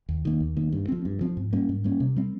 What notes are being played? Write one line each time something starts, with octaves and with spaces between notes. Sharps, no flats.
D#2
D#3 A#3
D#2
D#3 A#3
G2
F3 C4
G2
F3 C4
G#2
G3 A#3 C#4
G#2
G3 A#3 C#4
C3
G3 C4